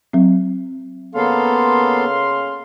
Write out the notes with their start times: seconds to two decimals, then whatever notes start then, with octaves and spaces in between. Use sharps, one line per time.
0.13 F#3 C4
1.15 C#3 A#3 B3 A4 F5 C6